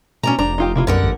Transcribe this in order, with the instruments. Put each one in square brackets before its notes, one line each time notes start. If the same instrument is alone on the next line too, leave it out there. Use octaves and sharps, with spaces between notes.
[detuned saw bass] B2 [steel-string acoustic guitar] C#4 D4 A#5
[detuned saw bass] F1 [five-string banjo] D4 C5 [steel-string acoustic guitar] A#5
[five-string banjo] D#4 F4 G4
[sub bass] C3 [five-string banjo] A#3 E4 F4
[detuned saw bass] B1 [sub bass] F#2 [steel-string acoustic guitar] D3 A#4 F#5 [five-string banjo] G3 A#5
[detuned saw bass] A1